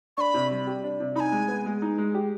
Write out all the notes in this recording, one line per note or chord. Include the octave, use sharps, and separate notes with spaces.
D4 B5 C#6
C3
G3
G4
D4
C3
D#4 G#5 B5
G#3
B3
G#3
D#4
G#3
G4